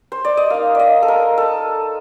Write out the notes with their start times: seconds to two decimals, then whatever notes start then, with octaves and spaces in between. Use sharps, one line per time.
0.12 C5
0.25 D5
0.37 D#5
0.50 A#3 D#4 F5
0.75 D5 D#5
1.02 A4
1.08 A#4
1.38 A4